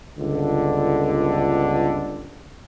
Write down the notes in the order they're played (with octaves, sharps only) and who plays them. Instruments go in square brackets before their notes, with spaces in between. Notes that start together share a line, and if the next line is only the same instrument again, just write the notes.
[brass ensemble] G1 C#2 D3